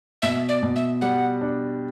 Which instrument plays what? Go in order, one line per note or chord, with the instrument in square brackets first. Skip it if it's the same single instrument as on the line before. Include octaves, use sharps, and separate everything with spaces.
[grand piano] B2 [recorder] E5
[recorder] D5
[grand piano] B2
[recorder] E5
[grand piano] G3 [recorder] F#5
[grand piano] D4